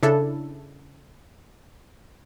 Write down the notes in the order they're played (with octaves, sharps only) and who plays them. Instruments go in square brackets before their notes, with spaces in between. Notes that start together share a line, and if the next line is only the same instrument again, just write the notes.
[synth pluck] C#3 D4 E4 A4